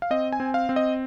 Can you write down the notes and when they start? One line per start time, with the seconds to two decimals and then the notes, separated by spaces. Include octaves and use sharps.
0.02 F5
0.10 C4 D#5
0.32 G#5
0.40 C4
0.54 F5
0.69 C4
0.76 D#5